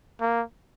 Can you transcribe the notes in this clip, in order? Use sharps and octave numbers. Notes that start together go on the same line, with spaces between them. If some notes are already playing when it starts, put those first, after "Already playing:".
A#3